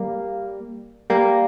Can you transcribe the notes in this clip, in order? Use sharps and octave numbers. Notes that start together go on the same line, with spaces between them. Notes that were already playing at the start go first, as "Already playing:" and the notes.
Already playing: G3 A#3
G3 A#3